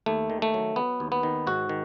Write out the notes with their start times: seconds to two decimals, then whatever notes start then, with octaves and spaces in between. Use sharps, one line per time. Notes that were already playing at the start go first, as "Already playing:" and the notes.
0.06 D#2 A3
0.30 D#3
0.42 A3
0.54 F#3
0.76 F#3 B3
1.00 D#2
1.12 B3
1.23 D#3
1.47 G#2 F#4
1.69 D#3